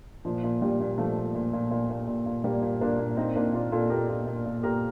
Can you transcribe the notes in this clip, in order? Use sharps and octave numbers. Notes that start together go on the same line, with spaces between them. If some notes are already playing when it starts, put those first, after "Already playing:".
A#2 F3
A#2
A#2 G3
A#2
A#2 F3 A3
A#2
A#2
A#2
A#2
A#2
A#2
A#2
A#2 G3 A#3
A#2
A#2 A#3 D4
A#2
A#2 C4 D#4
A#2 A#3 D4
A#2 D4 F4
A#2 F4 A4
A#2 G4 A#4
A#2
A#2
A#2
A#2 G4 A#4